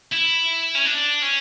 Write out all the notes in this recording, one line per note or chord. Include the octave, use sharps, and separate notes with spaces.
E4
C#4
D4
C#4